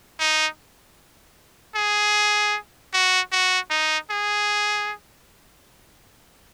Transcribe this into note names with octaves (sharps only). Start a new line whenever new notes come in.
D#4
G#4
F#4
F#4
D#4
G#4